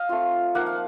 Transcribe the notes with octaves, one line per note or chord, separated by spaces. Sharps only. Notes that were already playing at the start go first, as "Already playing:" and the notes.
Already playing: D#5 F5
A3 C4 F4
F3 A#3 D#4 F#5
F5